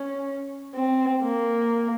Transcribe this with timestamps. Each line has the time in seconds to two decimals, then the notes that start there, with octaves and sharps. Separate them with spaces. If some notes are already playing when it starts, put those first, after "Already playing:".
Already playing: C#4
0.75 C4
1.23 A#3